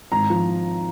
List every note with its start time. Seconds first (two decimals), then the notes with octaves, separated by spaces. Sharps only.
0.12 G#1 A#5
0.30 F3